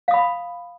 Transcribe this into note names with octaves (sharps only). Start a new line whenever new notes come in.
F5 B5 D#6